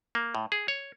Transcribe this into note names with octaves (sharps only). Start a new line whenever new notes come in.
A#3
A2
G#4
C#5